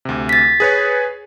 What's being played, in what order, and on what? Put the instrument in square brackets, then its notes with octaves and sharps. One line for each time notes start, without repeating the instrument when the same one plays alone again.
[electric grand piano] D2 C3
[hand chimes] A6 B6
[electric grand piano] G#4 B4 C#5